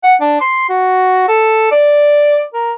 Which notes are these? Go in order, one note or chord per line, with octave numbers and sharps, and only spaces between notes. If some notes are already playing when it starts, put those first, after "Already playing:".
F#5
D4
C6
F#4
A4
D5
A#4